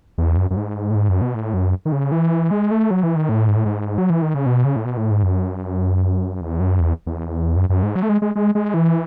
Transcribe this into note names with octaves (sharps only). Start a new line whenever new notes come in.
E2
F#2
F#2
G#2
A2
G#2
F#2
B2
A2
F#2
D#3
C#3
E3
G#3
A3
F#3
E3
D#3
A2
G#2
A2
G#2
F#3
E3
D#3
C#3
B2
C#3
A2
B2
A2
G#2
F#2
E2
F#2
E2
E2
F#2
F#2
G#2
F#3
A3
G#3
G#3
G#3
G#3
E3